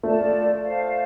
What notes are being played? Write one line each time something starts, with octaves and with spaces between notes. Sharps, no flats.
A3 F4 A4 D5 A5
C5 F5 A5